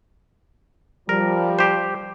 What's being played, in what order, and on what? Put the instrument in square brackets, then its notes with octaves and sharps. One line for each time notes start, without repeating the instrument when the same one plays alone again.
[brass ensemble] F3 G3 [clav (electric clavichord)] A#4
[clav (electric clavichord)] G4 C5